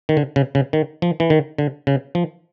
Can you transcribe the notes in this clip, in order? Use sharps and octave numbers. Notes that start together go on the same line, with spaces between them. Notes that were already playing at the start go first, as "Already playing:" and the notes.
D#3
D3
C#3
C#3
D#3
F3
E3
D#3
D3
C#3
F3